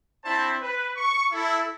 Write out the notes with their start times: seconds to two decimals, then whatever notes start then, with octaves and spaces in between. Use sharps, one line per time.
0.25 C4 D4 E4 C5 A5
0.61 B4
0.97 C#6
1.32 E4 A4